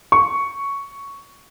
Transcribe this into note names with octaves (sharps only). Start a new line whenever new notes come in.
C#6